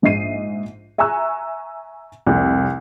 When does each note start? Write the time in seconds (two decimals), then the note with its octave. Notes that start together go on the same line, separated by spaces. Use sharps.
0.02 A#1 G#2 D#5 E5 C7 D#7
0.98 E5 G#5 A#5 C#6 E6 F#6
2.26 F1 C2